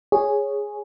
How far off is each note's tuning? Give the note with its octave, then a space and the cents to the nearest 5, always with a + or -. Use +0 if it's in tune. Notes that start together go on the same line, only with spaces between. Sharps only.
G#4 -5 C#5 +0